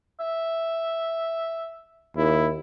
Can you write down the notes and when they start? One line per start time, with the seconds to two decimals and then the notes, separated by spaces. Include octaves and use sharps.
0.20 E5
2.17 D#2 E4